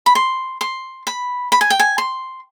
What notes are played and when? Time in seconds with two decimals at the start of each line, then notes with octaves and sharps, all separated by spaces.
0.06 B5
0.15 C6
0.61 C6
1.07 B5
1.52 B5
1.61 G#5
1.70 G5
1.80 G#5
1.98 C6